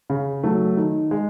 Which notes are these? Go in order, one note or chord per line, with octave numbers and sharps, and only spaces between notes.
C#3
F#3 A3
D#3
G#3